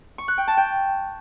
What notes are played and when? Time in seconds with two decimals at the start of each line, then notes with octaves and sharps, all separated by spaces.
0.18 C#6
0.28 F#6
0.38 G5
0.48 A5
0.57 G5